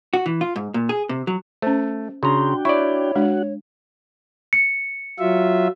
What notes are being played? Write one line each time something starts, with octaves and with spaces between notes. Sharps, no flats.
F#4
E3
F4
G#2
A#2
G#4
C3
F#3
A3 C#4 C5
C#3 D4 F#4 G5 A#5 C6
E4 C#5 D5 C#6
G#3 D4 F#4 F#5
C#7
F#3 F4 E5